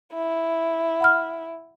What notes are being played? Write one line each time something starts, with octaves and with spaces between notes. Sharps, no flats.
E4
F#5 B5 F6